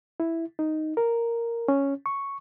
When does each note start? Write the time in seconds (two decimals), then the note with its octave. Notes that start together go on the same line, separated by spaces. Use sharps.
0.20 E4
0.59 D#4
0.97 A#4
1.68 C#4
2.06 C#6